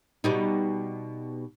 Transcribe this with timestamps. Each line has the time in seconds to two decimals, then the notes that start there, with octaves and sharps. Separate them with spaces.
0.24 B2 G3 D#4